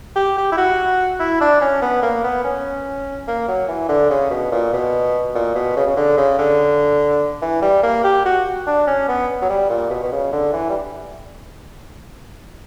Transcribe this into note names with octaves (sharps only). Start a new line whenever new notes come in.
G4
G4
E4
F#4
E4
D4
C#4
B3
A#3
B3
C#4
A#3
F#3
E3
D3
C#3
B2
A#2
B2
A#2
B2
C#3
C#3
D3
C#3
D3
E3
G3
A#3
G4
F#4
D4
C#4
B3
F#3
G3
A#2
B2
B2
C#3
D3
E3
G3